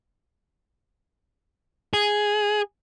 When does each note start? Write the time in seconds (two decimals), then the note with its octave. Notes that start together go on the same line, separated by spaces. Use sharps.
1.94 G#4